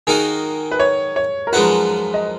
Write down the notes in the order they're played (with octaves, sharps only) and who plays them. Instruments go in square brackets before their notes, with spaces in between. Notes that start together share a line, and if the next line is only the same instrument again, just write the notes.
[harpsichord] D#3 A#3 D#4 F#4 [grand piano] G#4
[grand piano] B4
C#5
C#5
A#4
[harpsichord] F#2 F3 G#3 D#4 F#4 [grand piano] B4
[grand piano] D#5